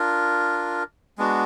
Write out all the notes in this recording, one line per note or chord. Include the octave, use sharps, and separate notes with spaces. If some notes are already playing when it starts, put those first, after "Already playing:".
Already playing: D4 F4 A#4
G#3 B3 D4 F#4